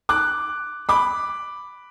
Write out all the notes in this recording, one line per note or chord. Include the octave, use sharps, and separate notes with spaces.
D6 F#6
B5 D6